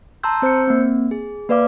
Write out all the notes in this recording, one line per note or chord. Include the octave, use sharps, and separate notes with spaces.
A5 A#5 C6 E6 G6
C4 C5 E6 G6 C#7
A#3 C4
G#4
A#3 B4 D5 F5 D6